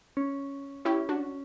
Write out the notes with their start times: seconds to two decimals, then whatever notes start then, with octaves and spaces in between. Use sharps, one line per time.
0.17 C#4
0.85 C#4 E4 G4
1.09 D4 F#4